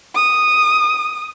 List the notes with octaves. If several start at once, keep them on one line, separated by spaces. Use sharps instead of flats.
D#6